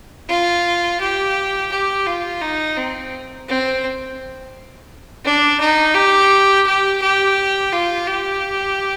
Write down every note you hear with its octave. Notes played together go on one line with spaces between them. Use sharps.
F4
G4
G4
F4
D#4
C4
C4
D4
D#4
G4
G4
G4
F4
G4